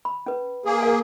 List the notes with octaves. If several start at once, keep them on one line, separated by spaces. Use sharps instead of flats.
B5
C#4 B4
A#3 G#4
A#4 F5 G#5